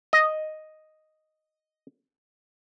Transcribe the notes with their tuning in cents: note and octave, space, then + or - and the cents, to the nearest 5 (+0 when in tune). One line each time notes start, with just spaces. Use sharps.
D#5 +0